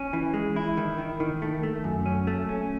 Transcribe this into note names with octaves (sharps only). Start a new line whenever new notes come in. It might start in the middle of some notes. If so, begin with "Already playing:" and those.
Already playing: C#4
E3
G#3
E4
D#3
D#3
D#3
A3
A3
F#2
C#4
A3
C#4